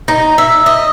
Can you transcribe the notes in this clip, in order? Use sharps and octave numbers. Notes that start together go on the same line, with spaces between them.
D#4
E5
D#5